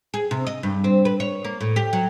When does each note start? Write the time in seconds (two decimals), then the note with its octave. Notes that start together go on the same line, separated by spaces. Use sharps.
0.14 G#4
0.31 C3
0.47 D#5
0.63 G2
0.84 C4
1.05 B4
1.20 C#5
1.44 A#3
1.61 A2
1.76 G4
1.93 F#3